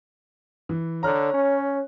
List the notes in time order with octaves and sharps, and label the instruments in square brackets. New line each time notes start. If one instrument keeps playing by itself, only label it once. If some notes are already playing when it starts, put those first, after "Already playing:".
[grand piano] E3
[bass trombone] D3 [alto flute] C#5 [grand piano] A#5 F6 F#6
[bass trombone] C#4